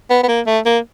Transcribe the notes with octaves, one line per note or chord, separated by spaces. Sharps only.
B3
B3
A#3
A3
A#3